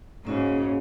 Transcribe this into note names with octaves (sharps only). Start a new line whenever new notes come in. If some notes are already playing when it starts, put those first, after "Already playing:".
G#2 C#3 A#3 C#4 F#4